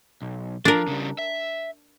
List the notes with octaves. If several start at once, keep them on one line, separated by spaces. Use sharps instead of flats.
B1
F3 D4 A#4
C#3 G3
E5